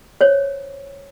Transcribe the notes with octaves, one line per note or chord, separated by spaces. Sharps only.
C5 C#5